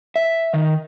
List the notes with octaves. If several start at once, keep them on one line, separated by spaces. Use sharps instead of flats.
E5
D#3